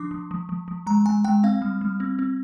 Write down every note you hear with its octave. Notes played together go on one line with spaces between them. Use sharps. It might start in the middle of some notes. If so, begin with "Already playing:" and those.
Already playing: F3 D4 C6 D6
F3
F3
F3
F3
G#3 A#5
G#3 G#5
G#3 G5
C4 F5
G3
G3
C4
C4